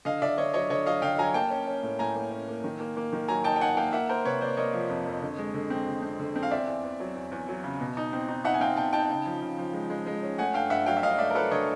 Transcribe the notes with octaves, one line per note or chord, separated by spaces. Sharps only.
D3 D#5 F5
D3 D5 E5
D3 C#5 D#5
F#3 C#5 D#5
D3 C#5 D#5
F#3 D#5 F5
D3 F5 G5
F#3 G#5 A#5
A#3 G5 A5
C#4
C#4
A2
A2 G#5 A#5
A#3
C#4
A#3
D#3
A#3
A#3
D#3
F#3 G#5 A#5
D#4 G5 A5
G5
D#4 F#5 G#5
A#3 F5 G5
A#3 E5 F#5
A#3 A#4 C5
C3 B4 C#5
A#3 C5 D5
A#3 C#5 D#5
F3
F2
F2
D3
G#3
D3
C4
D3
C4
D3
C4
F5
E2 D5 E5
E2
E2
F#3
E2
E2
F#3
C#3
B2
D#4
C4
D#4
D#4 E5 F#5
G#5
C4 F5 G5
B2 G5 A5
D#4 G5 A5
C#3
F3
C#3
F3
G#3
G#3
G#3
C#4
A3 F#5 G#5
G2 F5 G5
G2 E5 F#5
F#3 F5 G5
E5
G2 D#5 F5
A3 D5 E5
A#4
F#3 A4 B4
D3 C#5 D#5